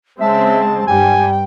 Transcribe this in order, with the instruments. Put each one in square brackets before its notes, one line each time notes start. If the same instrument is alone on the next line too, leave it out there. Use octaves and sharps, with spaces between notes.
[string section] C#3 G#3 C4 [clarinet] E5 [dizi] A5
[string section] G2 G3 [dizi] G5 [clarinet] G#5